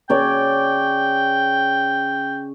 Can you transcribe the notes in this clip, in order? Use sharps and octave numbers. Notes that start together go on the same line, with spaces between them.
C#3 C#5 D5 G5